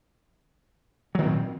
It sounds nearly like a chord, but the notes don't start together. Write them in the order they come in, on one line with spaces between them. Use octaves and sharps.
F#3 D#3 C4 A#2